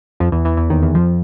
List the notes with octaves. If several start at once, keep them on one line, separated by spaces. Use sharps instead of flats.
F2 F3
E2 E3
E2 E3
E2 E3
D#2 D#3
E2 E3
F2 F3